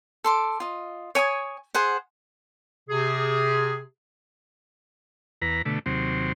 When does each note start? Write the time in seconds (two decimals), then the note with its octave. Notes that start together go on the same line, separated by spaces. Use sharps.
0.24 A4 C6 D6
0.60 F4 D#5
1.15 C#5 G#5 C#6 D#6
1.74 G#4 C5 F#5
2.90 C3 G#4
5.42 E2 B4 A#5
5.65 B2 D3 A3
5.86 D#2 C3 F#3 C4